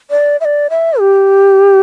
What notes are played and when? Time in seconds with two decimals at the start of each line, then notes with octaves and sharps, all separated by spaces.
0.11 D5
0.41 E5
0.45 D5
0.70 E5
0.99 G4